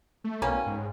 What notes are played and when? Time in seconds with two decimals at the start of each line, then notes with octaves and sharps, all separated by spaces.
0.24 A3
0.42 B1 G3 A#3 C#4
0.66 G#2